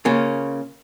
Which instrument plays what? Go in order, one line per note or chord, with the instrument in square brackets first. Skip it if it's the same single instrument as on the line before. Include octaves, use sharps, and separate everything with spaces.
[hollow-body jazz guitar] C#3 A#3 C#4 F4